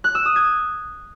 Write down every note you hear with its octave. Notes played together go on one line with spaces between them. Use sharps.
F#6
E6
D#6
G#6